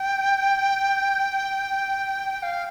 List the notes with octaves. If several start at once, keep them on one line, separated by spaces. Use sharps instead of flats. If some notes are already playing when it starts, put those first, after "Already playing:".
Already playing: G5
G5
F5